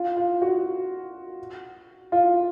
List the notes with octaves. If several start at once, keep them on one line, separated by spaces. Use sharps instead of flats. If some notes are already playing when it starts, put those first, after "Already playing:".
Already playing: F4
F4
F#4
F4